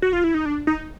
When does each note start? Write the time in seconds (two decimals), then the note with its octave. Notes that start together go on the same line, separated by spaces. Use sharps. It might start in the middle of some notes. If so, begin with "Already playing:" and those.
0.02 F#4
0.13 F4
0.24 E4
0.34 D#4
0.45 D4
0.67 D#4